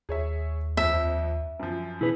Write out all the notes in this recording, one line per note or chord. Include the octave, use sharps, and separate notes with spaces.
D#2 G#4 C#5 E5
F2 E5 E6
F#2 F3
B2 E4 G#4 B4